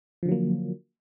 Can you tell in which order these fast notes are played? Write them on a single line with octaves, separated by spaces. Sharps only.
F3 D3 F#3 A#3